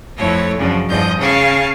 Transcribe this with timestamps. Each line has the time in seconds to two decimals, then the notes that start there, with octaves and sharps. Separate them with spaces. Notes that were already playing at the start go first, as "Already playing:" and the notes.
0.17 F2 A3 E4 C#5
0.58 F#2 C#3 F3 D4
0.89 E2 G2 F3 D#5 G6
1.19 C#3 F5 G#5 A5